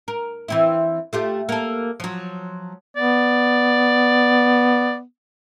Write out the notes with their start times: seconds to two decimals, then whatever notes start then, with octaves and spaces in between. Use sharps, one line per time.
0.08 A#4
0.48 E3 C4 E4
1.13 A3 F4 G4
1.49 A#3 A4
2.00 F3 F#3
2.97 B3 D5